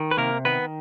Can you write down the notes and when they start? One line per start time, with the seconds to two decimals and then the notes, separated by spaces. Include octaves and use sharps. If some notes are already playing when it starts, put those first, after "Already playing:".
Already playing: D#3
0.11 B4
0.17 C3 A#3 A#4
0.45 D#3 B3 B4